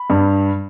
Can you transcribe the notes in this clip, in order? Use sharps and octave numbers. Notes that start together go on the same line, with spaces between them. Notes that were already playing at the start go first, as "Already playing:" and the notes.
Already playing: B5
G2